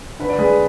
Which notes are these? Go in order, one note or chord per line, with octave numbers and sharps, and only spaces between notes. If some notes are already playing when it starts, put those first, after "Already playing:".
D3 B4
D5
G#3 G#4 B4